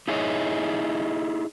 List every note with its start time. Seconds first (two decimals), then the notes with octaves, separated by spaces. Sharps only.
0.08 D#4 E4 G#4 C#5 D#5